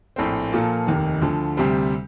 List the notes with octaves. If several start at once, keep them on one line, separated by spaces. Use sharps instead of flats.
A#1 A2 A3 C4
A#2 F3 A#3 F4 A4
F1 D#2 D#3
D2 D3 F3
D2 C3 G3 C4